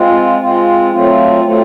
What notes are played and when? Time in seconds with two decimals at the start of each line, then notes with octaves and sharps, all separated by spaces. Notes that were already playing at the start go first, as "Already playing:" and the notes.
Already playing: G#3 C4 F4
0.39 G#3 C4 F4
0.92 F#3 A3 C4 F4
1.44 F#3 A3 C4 F4